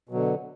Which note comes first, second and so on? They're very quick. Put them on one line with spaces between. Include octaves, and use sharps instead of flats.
B2 F#3 D3